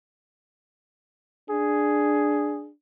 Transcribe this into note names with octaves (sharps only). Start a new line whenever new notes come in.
D4 G#4